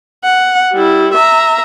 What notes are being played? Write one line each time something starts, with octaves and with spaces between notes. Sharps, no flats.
F#5
G3 E4
E5 A#5